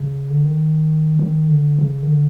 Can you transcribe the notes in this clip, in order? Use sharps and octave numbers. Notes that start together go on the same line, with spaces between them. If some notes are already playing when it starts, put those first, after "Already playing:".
Already playing: C#3
D3
D#3
D#3
D3
C#3
D#3
D3